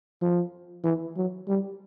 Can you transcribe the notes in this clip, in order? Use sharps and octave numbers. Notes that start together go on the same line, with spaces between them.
F3
E3
F#3
G3